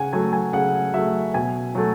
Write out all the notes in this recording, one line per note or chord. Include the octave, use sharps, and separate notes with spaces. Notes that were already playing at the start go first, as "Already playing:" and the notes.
Already playing: C#3 F#5 G#5
F#3 A3 G#5
G#5
C#3 F#5
F#3 A3 E5
B2 G#5
F#3 A3